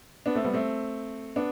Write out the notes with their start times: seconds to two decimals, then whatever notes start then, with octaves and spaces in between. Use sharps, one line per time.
0.26 B3 D4
0.35 A3 C4
0.44 G3 B3
0.53 A3 C4
1.36 B3 D4